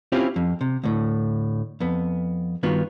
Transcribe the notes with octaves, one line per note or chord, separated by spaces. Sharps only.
C4 C#4 E4 F4 G4
F2
C3
D2 A2
F2 B3
G2 D#3 B3 F4 F#4